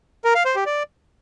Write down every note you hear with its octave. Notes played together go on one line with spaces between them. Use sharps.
A#4
F5
C5
G4
D5